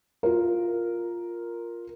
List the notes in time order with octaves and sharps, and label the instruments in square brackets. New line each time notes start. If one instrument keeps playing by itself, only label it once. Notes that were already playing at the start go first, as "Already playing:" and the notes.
[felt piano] F4 A#4